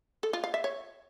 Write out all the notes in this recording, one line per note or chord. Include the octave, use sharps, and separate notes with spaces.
A4
F4
F5
E5
C#5